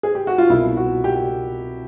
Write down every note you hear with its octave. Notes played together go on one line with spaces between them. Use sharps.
G#4
G4
F#4
F4
C2 B2 E4
F#4
G4